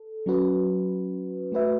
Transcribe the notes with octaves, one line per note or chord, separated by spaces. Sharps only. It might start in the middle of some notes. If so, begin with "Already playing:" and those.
Already playing: A4
F#3 C#4 F#4 B4
A3 F#4 B4 E5